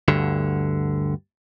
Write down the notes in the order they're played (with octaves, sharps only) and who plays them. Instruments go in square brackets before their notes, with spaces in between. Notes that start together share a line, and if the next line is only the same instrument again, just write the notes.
[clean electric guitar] D2 G2 D3